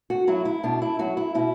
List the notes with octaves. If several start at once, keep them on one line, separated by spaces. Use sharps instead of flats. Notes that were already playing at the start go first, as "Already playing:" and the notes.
F#4
F#3 E4
E4
B2 D4
E4
F#3 F#4
E4
B2 E4